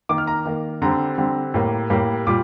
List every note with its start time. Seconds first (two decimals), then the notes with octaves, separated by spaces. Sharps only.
0.09 D#3 A#3 D6
0.18 F6
0.27 A#5
0.46 D#3 A#3
0.82 D3 G3 C4 A#5
1.18 D3 G3 C4
1.54 A2 G3 A#3
1.90 A2 G3 A#3
2.27 A#2 G3 D6